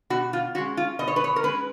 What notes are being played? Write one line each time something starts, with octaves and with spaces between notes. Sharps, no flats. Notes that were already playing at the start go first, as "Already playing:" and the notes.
B2 F#4
F4
G#3 C#4 F#4
F4
B2 D#5
C#5
B4
C#5
A#4
G#3 C#4 B4